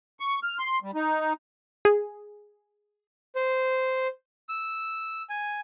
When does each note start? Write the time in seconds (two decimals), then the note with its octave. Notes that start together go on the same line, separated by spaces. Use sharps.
0.20 C#6
0.43 F6
0.59 C6
0.83 G3
0.95 D#4
1.85 G#4
3.35 C5
4.49 E6
5.30 G#5